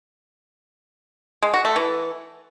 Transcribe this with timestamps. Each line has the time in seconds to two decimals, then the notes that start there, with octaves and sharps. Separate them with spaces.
1.42 G#3
1.54 F#4
1.65 A3
1.76 E3